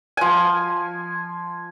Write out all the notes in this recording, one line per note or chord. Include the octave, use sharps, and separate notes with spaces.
F3 G#5